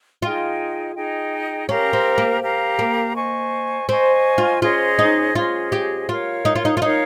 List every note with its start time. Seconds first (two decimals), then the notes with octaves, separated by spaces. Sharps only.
0.22 D#4 F4 G#4 D#5 G5
0.95 D#4 G#4 D#5 G5
1.68 C#4 G4 A#4 F5 A#5
1.93 C4
2.18 A#3
2.42 G4 A#4 F5 A#5
2.79 A#3
3.15 C5 D#5 G#5 C#6
3.89 C4 C5 D#5 G#5 C#6
4.38 F4
4.62 C#4 F4 G#4 C5 D#5
4.99 D#4
5.35 C#4 F4 G#4 C5 D#5
5.72 G4
6.09 F4 A#4 C#5 F5
6.45 D#4
6.55 F4
6.65 D#4
6.77 F4
6.82 D#4 A#4 C#5 F5